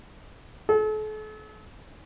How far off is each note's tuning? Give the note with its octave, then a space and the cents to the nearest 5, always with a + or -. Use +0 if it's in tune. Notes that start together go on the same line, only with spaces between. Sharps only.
A4 -40